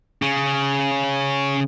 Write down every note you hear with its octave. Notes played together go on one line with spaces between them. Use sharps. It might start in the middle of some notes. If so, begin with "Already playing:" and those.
C#3 C#4